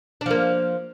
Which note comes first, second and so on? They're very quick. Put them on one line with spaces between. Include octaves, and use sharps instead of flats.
D4 F3 A#3